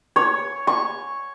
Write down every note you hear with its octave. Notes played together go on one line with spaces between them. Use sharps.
C#5
C#6